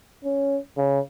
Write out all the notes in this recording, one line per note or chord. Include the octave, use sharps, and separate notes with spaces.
C#4
C#3